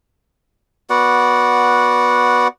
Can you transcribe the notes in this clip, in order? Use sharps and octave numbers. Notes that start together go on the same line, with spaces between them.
B3 F#4 D5 F#5